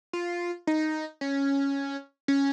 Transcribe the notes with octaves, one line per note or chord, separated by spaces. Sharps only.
F4
D#4
C#4
C#4